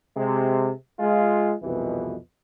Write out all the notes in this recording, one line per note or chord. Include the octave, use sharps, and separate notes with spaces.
C3 G#3
G#3 F4
C2 F2 B2 E3